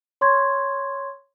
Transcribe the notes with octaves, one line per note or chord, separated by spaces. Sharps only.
C#5 C6 C#6 G#6